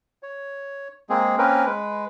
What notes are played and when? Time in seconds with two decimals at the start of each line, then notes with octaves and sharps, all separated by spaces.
0.23 C#5
1.10 G#3 A#3 C4 G#4
1.38 A#3 C4 C#4 A#4 B4
1.66 G#3 B4